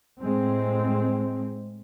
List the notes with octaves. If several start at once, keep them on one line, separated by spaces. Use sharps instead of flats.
A2 G#3 C4